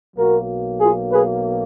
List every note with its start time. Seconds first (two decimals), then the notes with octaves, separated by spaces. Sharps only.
0.17 B1 B2 F#3 A#3 F#4 A#4
0.80 F4 G#4
1.12 G#4 B4